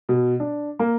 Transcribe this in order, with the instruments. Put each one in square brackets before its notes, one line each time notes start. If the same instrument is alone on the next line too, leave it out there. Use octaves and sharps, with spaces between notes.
[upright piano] B2
D4
A#3